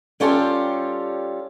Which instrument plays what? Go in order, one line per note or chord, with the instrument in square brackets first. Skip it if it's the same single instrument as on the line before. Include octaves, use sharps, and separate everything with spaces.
[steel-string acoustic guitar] G3 C#4 F4 G4 A4